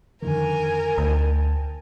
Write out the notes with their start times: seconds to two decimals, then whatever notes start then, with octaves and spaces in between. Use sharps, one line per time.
0.22 F2 D3 D#3 A#4 G#5
0.98 D2 G5 A5